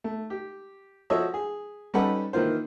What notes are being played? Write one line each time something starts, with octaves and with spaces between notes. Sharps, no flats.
A3
G4
F3 F#4 A4 C#5 D#5 E5
G#4
G3 C#4 D#4 A4 B4 F#5
D#3 E3 A#3 F4 C5